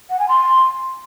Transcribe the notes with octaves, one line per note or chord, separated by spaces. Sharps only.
F#5
G#5
C6